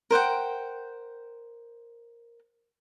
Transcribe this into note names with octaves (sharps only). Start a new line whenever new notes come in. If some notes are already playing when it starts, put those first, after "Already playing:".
A#4 C5 F#5 G5